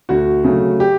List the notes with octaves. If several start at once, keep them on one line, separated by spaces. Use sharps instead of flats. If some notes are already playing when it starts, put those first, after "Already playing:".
D2 F#4
C#3 F#3 A3
G4